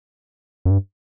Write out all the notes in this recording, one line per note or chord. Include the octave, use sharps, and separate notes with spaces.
F#2
G2